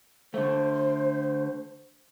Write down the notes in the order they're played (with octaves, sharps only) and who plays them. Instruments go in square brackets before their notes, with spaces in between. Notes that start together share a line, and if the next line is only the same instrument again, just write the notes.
[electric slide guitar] D3 A3 [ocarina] C5